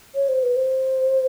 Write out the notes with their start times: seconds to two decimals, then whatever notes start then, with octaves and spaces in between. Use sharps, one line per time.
0.15 C#5
0.28 C5
0.43 B4
0.56 C5